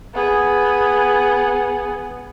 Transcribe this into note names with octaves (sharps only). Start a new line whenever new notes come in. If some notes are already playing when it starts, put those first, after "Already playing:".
B3 G#4